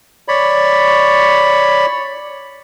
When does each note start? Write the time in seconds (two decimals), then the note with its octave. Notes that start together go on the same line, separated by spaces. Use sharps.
0.28 C#5 D5 B5